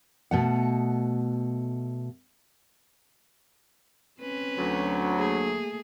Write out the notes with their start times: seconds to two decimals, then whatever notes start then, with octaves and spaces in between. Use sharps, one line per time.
0.31 B2 A3 F#5
4.21 C4 C#4 B4
4.58 D2 F#3
5.17 A3 A#3 G#4